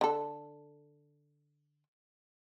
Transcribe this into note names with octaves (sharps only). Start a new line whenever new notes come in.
D3 A4